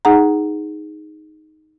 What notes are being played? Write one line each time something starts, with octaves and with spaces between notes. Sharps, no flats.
D#4 G#4 F#5 A#5